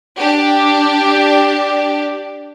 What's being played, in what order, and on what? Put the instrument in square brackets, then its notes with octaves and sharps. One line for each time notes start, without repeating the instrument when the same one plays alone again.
[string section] D4 G4